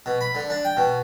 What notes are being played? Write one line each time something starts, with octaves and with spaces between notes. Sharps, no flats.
B2
B5
D3
D4
G5
B2